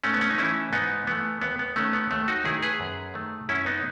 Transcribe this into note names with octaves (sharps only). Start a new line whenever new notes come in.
G#2 A3 C#4
B3
C#4
D#4
E3 A3 C#4 E4
G#2 B3 D#4
E3 A3 B3
D#2 B3
B3
D#3 A3 C#4
B3
D#2 A3
D#4 F#4
D#3 A3 E4 G#4
G#4 B4
F#2
D#3 A3
F#2 C#4 E4
B3 D#4